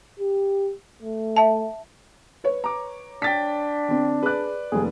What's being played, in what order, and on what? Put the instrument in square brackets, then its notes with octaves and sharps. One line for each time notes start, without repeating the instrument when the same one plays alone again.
[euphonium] G4
A3
[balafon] E5 A5
[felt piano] B4 C#5
[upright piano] A#5 D6
[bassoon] D4 [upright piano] G5 A6 B6
[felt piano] D3 C4
[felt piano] G#4 F#6 [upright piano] B4 D5
[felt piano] F1 D#2 [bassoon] G#4